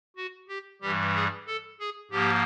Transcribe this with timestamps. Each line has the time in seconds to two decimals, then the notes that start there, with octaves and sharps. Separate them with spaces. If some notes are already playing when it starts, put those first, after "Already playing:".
0.17 F#4
0.49 G4
0.82 G2 E3 G3 G4
1.15 G#4
1.47 A4
1.80 G#4
2.11 G#2 F3 A#3 G4